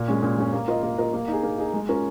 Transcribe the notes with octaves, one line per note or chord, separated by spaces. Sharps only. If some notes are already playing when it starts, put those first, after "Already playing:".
Already playing: A#2
G#3 C#4
A#2
G#3 C#4
A#3
F4 A#4 D#5
A#3
F4 A#4 D#5
A#3
D#4 G#4
A#3
D#4 G#4
G#3
C#4 F4 A#4